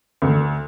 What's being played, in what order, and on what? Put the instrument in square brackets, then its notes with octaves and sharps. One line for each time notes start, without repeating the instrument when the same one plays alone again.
[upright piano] D2